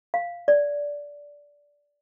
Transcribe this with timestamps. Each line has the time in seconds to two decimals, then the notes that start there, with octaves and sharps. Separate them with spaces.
0.14 F5
0.48 D5